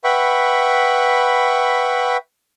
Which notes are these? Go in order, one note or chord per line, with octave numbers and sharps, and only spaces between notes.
B4 E5 F#5 G5 B5 C#6